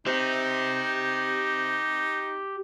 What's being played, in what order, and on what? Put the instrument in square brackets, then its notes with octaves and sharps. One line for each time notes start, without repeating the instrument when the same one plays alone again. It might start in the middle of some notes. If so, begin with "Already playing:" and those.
[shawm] D#4 [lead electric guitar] G4 C5